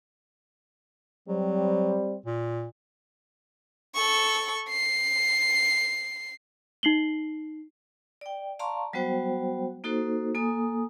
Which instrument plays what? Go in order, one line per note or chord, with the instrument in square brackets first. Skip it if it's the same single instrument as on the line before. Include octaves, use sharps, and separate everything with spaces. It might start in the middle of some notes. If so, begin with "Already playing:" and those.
[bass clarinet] F#3 [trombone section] G3 C4
[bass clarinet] A#2
[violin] A4 C#6
C7
[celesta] D#4 C7 F#7 G7
[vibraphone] D5 G5
D5 F5 A5 A#5 C6 C#6
F#3 G3 B3 F#4 C5 G5
A#3 D#4 F#4 A4 C5
A#3 A4 G#5 D#6